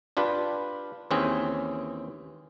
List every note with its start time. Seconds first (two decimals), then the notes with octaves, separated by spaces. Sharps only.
0.17 D4 F4 G4 B4
1.11 D#2 E3 C4 C#4 G#4 G5